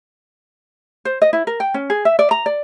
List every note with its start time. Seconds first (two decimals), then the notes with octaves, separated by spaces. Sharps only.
1.05 C5
1.22 D#5
1.33 E4
1.47 A#4
1.60 G5
1.74 C#4
1.90 G#4
2.05 E5
2.19 D5
2.31 A#5
2.46 D5